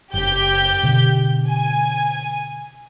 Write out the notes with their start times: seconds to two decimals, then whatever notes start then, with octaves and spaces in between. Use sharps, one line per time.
0.14 F#1 G4 G6
0.83 B2 D3
1.47 G#5